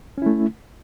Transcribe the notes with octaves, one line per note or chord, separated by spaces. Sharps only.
A3 C#4 E4